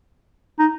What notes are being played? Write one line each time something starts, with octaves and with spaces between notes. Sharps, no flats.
D#4